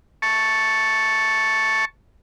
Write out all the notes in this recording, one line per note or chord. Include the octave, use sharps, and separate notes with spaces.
A5 C#6